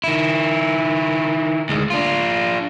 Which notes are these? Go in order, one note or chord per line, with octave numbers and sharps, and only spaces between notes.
D#3 E4
D2 G#3
D4 F4